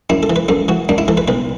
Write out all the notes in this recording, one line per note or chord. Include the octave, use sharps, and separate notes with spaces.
F#2 E4
A4
E3
B4
F#2 A4
E3 F#4
F#2 D4
E4
E3 A4
B4
B1 B4